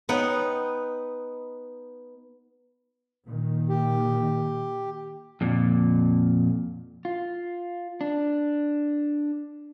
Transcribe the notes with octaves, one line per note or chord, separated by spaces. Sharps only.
B3 D#4 F#5 G5
A#2 D#3
G4
F2 A#2
F4
D4